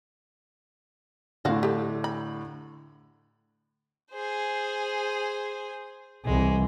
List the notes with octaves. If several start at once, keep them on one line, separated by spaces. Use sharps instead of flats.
A2 D3 F4 F#4 F5
G4 A4
B5
G#4 C5
C2 E3 G#3